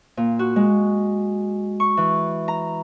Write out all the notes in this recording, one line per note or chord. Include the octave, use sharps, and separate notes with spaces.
A#2
F#4
G#3
C#6
E3
A#5